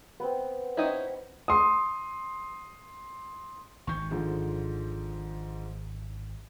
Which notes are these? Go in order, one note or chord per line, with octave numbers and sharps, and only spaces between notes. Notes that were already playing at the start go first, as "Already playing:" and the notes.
B3 C4
C4 C#4 D#4 E4
C6 D#6
G#1 D#3 C#6 G6
G#2 D3 F3